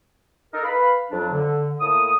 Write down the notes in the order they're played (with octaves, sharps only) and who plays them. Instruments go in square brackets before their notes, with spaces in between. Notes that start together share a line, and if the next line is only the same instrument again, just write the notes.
[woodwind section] D#4 A4 A#4
B4 F5 B5
F2 F#3 D4
D3
A2 A#3 A5 D#6